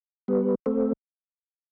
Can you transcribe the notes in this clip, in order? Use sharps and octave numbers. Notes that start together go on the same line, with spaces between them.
G3 B3
A3 C4